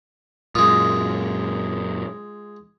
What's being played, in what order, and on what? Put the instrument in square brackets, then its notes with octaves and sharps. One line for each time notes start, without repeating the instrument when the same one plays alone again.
[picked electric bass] F#2 A#2 [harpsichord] G#3 F4 [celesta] D#6